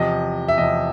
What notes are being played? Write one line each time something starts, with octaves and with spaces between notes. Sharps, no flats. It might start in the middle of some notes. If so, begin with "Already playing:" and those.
Already playing: E2 C3 F3 D#5
E5
E2 C3 F3 D#5